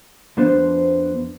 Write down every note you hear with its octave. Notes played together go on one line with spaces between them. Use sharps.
F2 F3 B3 D4 B4 C5